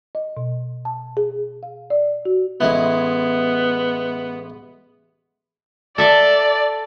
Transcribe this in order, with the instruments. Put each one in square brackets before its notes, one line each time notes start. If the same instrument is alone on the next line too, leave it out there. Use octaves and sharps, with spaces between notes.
[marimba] D#5
B2
A5
G#4
F5
D5
F#4
[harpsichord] A1 G#3 E4 [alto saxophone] B3
[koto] A4 E5 A5 [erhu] D5